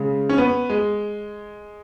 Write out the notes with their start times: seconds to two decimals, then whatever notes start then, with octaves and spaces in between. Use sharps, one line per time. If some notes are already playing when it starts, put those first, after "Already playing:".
Already playing: C#3 G#3
0.29 C#4
0.38 B3
0.70 G#3